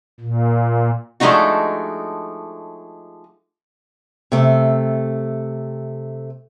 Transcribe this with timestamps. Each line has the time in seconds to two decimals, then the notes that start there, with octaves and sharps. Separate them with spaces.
0.20 A#2
1.20 F3 G#3 A3 D4 D#4 F#4
4.32 C3 A3